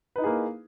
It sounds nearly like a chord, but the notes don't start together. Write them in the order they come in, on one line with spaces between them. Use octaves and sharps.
B4 D#4 E4 G#4 A#3